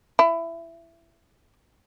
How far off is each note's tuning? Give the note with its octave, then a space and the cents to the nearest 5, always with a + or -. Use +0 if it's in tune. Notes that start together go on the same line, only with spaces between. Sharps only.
E4 +20